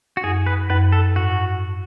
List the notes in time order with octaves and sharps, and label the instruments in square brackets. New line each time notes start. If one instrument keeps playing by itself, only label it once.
[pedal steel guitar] F#4
[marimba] F#2 [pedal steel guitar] G#4
[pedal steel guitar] B4
[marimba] F#2 [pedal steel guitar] B4
[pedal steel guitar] A4
[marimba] G#2 [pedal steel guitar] F#4